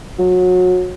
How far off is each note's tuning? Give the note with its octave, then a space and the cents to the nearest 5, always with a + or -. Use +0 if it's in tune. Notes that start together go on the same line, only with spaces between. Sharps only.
F#3 -25